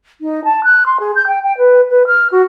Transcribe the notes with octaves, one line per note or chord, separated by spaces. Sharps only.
D#4
A5
F#6
C6
G#4
G6
G5
G5
B4
B4
F6
F#4